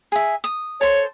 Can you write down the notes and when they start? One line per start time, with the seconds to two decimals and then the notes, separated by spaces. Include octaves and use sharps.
0.12 G#4 E5
0.44 D#6
0.81 A4 C5 C#5